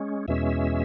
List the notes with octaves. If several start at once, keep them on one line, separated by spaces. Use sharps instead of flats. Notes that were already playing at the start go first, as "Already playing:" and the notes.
Already playing: G#3 C#4
E2 B2 G#3 C#4 E5